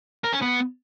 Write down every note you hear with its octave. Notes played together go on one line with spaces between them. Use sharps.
A#4
C#4
B3